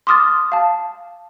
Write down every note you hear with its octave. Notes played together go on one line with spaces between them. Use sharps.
C6 D6 D#6 F6 A6
F5 A5